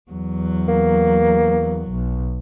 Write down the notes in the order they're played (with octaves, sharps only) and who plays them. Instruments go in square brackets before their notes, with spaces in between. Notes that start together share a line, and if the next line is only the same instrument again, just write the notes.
[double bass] E2 F#3
[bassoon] A#3
[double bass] B1